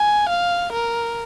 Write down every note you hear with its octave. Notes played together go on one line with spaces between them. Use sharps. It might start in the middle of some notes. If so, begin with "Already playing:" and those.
Already playing: G#5
F5
A#4